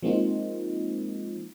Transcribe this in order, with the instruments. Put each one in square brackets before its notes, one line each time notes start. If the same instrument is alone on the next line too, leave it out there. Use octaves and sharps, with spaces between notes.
[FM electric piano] F3 G#3 A#3 C4 D#4 F4